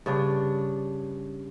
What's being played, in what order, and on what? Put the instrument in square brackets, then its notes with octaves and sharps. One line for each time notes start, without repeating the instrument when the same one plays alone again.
[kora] G2 C#3 D4